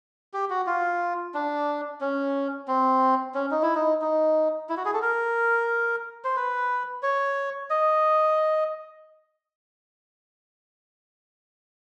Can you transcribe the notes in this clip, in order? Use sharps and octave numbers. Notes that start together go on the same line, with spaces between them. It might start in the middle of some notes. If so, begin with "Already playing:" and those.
G4
F#4
F4
D4
C#4
C4
C#4
D#4
E4
D#4
D#4
E4
F#4
G#4
A4
A#4
C5
B4
C#5
D#5